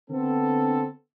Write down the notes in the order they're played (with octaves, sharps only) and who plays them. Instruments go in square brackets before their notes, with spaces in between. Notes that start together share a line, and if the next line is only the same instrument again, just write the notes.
[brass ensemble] D3 B3 C4 A4